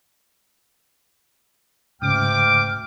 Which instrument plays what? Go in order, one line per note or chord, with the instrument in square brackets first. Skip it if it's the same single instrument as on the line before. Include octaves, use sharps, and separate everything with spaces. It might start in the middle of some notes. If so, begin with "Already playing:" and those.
[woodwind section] D2 G5 F6 [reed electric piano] G#2 C#3 [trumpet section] D6